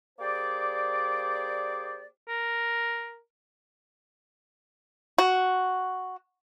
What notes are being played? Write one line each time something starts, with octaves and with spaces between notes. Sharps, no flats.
A#3 G4 G#4 C5 D5
A#4
F#4